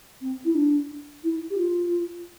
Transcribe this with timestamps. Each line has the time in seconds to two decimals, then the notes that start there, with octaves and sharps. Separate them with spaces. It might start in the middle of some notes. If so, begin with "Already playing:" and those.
0.21 C4
0.45 E4
0.55 D4
1.24 E4
1.50 G4
1.58 F4